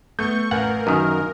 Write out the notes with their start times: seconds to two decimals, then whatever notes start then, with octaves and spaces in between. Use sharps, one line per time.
0.19 A3 B3 C#6 G6
0.51 A1 A#4 B4 F5 F#5 G#5
0.87 F#2 D#3 A#5 D#6 F6